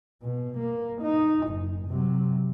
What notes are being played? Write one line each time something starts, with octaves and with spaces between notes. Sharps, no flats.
B2
A#3
D#4
F#1
C3 F#3